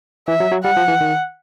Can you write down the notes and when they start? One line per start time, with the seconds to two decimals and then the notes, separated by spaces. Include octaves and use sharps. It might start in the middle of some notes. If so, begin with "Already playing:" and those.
0.28 E3 E5
0.40 F#3
0.51 F#3
0.64 G3 F#5
0.77 F3
0.88 E3
1.01 D#3